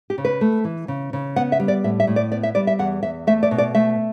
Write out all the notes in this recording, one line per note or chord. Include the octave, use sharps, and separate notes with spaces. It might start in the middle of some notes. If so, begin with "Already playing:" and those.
G4
C#3
B4
A3
E3
C#3
C#3
B3 F#5
E5
G3
D5
A2 E5
E5
A2
D5
B3 D5
E5
G3 D5
E5
E2 F#5
E2 E5
A3 E5
D5
B2
D5
A3 E5